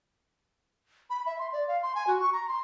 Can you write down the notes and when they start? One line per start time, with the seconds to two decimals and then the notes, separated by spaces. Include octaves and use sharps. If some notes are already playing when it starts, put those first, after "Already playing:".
1.10 B5
1.26 E5
1.39 C6
1.53 D5
1.68 F5
1.83 C6
1.95 G#5
2.07 F#4
2.20 C#6
2.33 A#5
2.48 C6